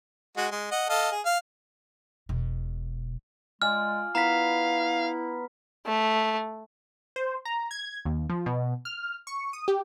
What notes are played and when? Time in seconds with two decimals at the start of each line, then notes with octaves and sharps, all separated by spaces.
0.37 G#3 F#4
0.52 G#3
0.72 D#5 F#5
0.90 A4 D#5 F5
1.12 G#4
1.26 F5
2.29 E1 B2
3.62 G#3 F4 D5 G#5 F6
4.15 B3 E4 F5 A#5 B6
5.86 A3
7.16 C5
7.45 A#5
7.71 G#6
8.05 D#2
8.30 F3
8.46 B2
8.85 F6
9.27 C#6
9.53 D#6
9.68 G4